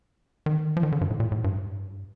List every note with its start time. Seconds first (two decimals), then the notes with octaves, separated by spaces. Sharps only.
0.46 D#3
0.77 F3
0.83 D#3
0.92 D3
1.01 G2
1.10 A2
1.20 A#2
1.32 A2
1.44 G2